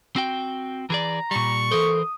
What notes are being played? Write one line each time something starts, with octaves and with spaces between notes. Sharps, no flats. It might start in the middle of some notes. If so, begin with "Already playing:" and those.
C4 F#4 G5
E3 G#4 D5 A#5
A#2 G3 C#6
E3 A4 A#4 C5 D#6